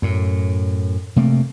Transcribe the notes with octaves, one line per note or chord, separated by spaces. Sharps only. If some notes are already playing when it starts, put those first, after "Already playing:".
F#2 A2
C3 A3 A#3